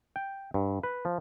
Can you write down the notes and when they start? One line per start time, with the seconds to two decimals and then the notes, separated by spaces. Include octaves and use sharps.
0.16 G5
0.54 G2
0.83 B4
1.05 F3